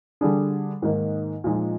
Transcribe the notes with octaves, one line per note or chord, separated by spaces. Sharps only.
D3 G3 D4 G#4
G#2 D#3 A#3 D#4
A#2 F3 G#3 D#4